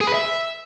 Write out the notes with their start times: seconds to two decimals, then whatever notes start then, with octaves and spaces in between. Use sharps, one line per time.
0.01 G#4
0.07 B4
0.14 E5